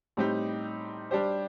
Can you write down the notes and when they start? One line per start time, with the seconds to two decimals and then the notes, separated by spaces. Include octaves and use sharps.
0.17 A2 G3 C4 D#4 G4
1.11 G3 D4 G4 C5